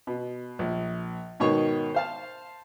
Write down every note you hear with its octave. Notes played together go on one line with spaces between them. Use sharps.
B2
A#1
G#2 B2 D#3 C#5 C#6
C5 F5 A5